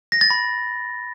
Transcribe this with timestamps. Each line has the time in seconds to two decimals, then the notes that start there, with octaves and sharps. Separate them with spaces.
0.12 A#6
0.21 A6
0.30 B5